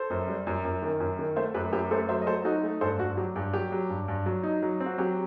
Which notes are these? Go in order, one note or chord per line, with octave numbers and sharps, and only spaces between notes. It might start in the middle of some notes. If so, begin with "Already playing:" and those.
Already playing: A4 C5
F#2
G3
F#2
F#2
D#3
F#2
D#3
A3 C5 E5
F#2 G4 B4
F#2 G4 B4
A3 A4 C5
F#3 C5 E5
D#5
F#3 A4 C5
D#4 F#4 A4
A3
G2 A4 C5
G2 F#4
F#3 G4
G2 G4
F#3 G4
F#3
G2
G2
F#3
D#4
F#3
C4
F#4
F#3 G4